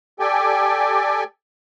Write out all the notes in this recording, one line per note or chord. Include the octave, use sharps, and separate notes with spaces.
G4 A4 D5 G5 G#5